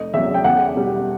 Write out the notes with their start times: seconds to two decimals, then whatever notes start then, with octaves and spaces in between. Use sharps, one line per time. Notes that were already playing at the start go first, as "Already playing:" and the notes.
Already playing: F1 D#5
0.14 E2 C#3 F#3 E5
0.34 G5
0.44 E2 F#5
0.76 B2 G3